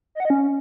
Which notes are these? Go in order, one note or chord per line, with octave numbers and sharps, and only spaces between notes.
D#5
F#5
D#5
C#4